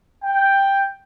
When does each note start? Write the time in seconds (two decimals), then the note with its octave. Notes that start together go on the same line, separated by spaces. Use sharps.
0.25 G5